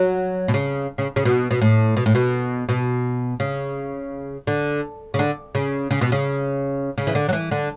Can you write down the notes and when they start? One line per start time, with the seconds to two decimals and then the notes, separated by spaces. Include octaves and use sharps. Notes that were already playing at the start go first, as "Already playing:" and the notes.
Already playing: F#3
0.48 B2
0.54 C#3
0.98 C#3
1.16 C#3
1.25 B2
1.51 B2
1.61 A2
1.97 B2
2.06 A2
2.15 B2
2.69 B2
3.40 C#3
4.47 D3
5.14 C#3
5.19 D3
5.55 C#3
5.91 C#3
6.01 B2
6.12 C#3
6.98 C#3
7.07 E3
7.15 D3
7.29 F#3
7.33 E3
7.51 D3